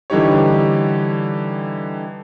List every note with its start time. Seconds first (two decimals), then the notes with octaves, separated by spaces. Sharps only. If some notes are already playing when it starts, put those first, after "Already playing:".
0.10 D3 E3 G3 D#4 G4 C#5